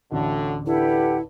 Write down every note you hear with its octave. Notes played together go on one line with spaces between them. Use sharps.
A1 D2 A2 D3 F#4
D4 E4 G4 A4 B4 F#5